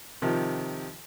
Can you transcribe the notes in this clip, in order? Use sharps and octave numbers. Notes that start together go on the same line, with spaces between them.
C3 D#3 F3